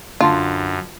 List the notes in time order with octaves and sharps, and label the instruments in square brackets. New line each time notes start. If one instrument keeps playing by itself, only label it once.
[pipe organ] F#2 [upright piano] D3 A5 [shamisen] F4